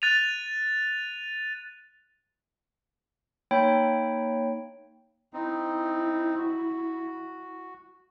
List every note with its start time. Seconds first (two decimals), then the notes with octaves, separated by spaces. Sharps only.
0.02 F#6 A6 D#7 F7
3.51 A#3 D#4 C#5 G5 B5
5.33 C4 D#4 E4
6.37 F#4